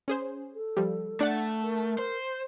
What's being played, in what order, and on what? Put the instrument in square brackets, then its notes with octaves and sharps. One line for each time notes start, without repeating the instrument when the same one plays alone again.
[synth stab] C#4 G#4 C5
[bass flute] A4
[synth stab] F3 G3
[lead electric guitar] A3 [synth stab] D4 F#5 A6
[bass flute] A#4
[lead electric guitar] C5